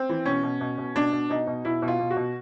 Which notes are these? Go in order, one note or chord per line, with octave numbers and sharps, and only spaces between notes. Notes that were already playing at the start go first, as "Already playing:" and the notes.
Already playing: C4
E3
B2 C#4
B2
B2
B2
B2 D4
B2
B2 D#4
B2
B2 E4
B2
F4
B2
F#4
B2